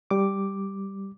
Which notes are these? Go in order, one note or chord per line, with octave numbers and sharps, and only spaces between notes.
G3 D6